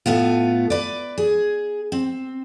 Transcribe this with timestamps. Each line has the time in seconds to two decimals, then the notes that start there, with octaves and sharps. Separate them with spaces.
0.06 A2 A3 B3 F4
0.70 B4 D5
1.18 G#4
1.92 C4